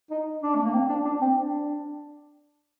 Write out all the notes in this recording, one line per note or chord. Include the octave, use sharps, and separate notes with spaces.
D#4
D4
A3
A#3
C4
D4
D4
C4
D4